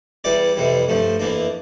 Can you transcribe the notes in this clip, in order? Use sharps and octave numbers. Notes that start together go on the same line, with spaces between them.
E2 E3 G3 D5
F2 C3 E3 G3
G2 F3 A3
F2 E3 A#3 D4